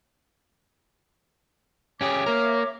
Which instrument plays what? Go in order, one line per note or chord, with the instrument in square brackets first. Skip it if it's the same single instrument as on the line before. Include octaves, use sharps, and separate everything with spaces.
[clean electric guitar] C#4 G4 G#4 [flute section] C#5 E5 D6
[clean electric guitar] A#3 A#4